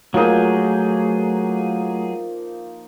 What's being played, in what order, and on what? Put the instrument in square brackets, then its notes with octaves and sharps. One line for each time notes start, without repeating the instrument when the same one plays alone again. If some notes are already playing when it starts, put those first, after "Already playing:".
[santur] F3 A#3 D#4 [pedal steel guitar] F#3 G#4 [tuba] A3